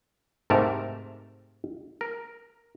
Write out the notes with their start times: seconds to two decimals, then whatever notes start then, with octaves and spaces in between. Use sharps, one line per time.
0.50 G#2 C3 A3 A#4 A5 A#5
2.01 A#4